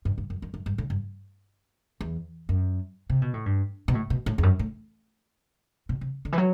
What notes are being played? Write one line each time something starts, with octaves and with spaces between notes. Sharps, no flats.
G2
G2
F#2
F#2
F#2
G2
A2
G2
E2
F#2
C3
B2
A2
G2
B2
A2
B2
A2
E2
F#2
A2
B2
C3
D3
E3
F#3